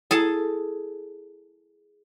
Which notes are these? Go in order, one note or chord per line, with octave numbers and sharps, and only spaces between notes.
E4 G#4 A4 A5